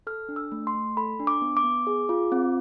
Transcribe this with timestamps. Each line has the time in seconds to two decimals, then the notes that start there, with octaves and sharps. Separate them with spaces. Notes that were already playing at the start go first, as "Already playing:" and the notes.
0.07 A4 F6
0.29 D4
0.36 E6
0.52 A3
0.67 C6
0.75 A3
0.97 A4 B5
1.20 D4
1.27 D6
1.42 B3
1.57 D6
1.64 B3
1.87 G#4
2.09 F4
2.32 C4